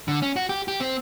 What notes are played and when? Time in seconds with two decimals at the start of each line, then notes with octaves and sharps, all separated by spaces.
0.08 D3
0.22 C#4
0.36 F#4
0.49 G4
0.68 G4
0.81 C4